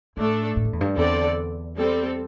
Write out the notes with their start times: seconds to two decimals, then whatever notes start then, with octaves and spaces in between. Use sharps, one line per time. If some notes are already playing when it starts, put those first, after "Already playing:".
0.17 A2 A3 D4 A4
0.57 A2
0.65 G2
0.73 E2
0.81 G2
0.97 E2 D3 C4 A4 D5
1.77 G3 C4 A4